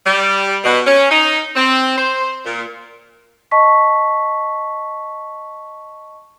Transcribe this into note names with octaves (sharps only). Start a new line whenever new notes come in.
G3
B2
C#4
D#4
C4
C5
A#2
D#5 A5 C#6 B6